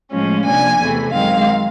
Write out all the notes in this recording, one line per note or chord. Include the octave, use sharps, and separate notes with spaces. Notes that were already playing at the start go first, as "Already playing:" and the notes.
A2 F3 G#3 C#4
C3 F3 A#3 D4 G#5
E2 C3 E3 A3
F#2 D#3 G#3 C4 F5